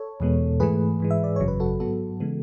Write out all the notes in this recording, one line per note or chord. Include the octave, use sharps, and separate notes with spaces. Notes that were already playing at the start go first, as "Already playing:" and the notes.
Already playing: A4 C#5
E2 B2 G#3 B3
G#2 E3 A3 G#4 B4
G#2 E3 G#3
E5
D5
G#1 F#2 C#3 F#3 C#5
B4
F#4 A4
G#2 F#3 B3 F#4 A4
C#3 E3 G#3 B3